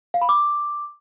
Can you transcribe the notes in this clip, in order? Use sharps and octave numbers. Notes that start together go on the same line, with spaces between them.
F5
B5
D6